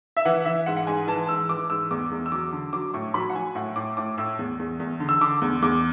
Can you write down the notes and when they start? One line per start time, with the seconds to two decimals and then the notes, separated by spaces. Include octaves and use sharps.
0.17 E5
0.25 E3 F#5
0.45 E3 E5
0.66 G#2 F#5
0.77 F#5
0.87 G#2 G#5
1.07 E3 A5
1.28 G#2 E6
1.49 E3 D6
1.70 G#2 E6
1.91 E2 D6
2.11 E2
2.26 E6
2.32 F#3 D6
2.52 D3
2.73 F#3 D6
2.94 A2 C#6
3.14 F#3 B5
3.30 F#5
3.35 F#3 G#5
3.55 A2 F#5
3.76 A2 D6
3.97 A2 D6
4.18 A2 E6
4.39 E2
4.60 E2
4.80 E2
5.00 D3
5.09 E6
5.21 D3 D6
5.42 E2
5.62 E2 D6